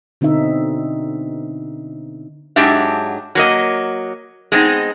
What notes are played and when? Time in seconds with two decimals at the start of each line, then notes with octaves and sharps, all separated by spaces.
0.21 B2 D3 C4 D#4 E5
2.56 G#2 F#3 G#3 D4 G4 E5
3.35 F#3 A#3 D#5
4.52 G#3 B3 C4 D#4